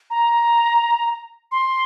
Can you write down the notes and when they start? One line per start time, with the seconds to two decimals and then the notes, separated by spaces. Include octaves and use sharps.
0.10 A#5
1.52 C6